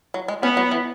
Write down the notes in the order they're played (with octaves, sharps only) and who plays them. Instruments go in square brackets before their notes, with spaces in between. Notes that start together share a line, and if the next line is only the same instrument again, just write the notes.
[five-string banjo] F#3
G#3
[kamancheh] B3 [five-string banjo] C#4
[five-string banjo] F#3
E3